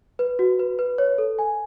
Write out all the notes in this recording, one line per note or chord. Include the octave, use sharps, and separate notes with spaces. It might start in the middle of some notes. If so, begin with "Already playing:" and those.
B4
F#4
B4
B4
C#5
A4
G#5